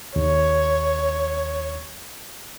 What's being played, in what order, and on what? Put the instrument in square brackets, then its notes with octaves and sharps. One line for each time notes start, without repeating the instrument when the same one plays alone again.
[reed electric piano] D#2 [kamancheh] C#5